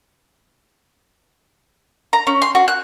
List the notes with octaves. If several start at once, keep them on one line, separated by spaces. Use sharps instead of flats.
A#5
C#4
C6
F#4
F#6